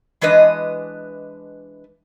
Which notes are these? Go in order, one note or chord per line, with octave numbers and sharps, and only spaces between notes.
E3 G#3 D4 B4 D#5